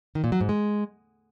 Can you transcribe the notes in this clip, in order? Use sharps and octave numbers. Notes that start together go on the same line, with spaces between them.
D#3
A#2
F#3
G#2
G#3